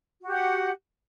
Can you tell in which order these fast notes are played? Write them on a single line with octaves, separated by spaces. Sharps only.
F#4 G4 F#5